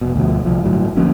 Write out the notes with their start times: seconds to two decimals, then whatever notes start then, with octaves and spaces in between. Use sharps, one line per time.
0.01 F1 B2
0.16 D2 B2 F3
0.44 C2 F3
0.62 G1 A2 F#3
0.97 D2 F3 A#3 C#4